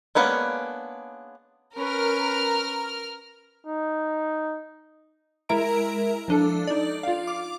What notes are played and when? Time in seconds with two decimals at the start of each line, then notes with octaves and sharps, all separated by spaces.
0.15 G#3 A#3 B3 C#4 D4
1.77 C#4 A#4 B4 F6
3.67 D#4
5.49 G#3 E4 A#4 E5 A#5 D7
6.28 F3 D4 A4
6.67 D#4 D5
7.03 F4 F5
7.27 D6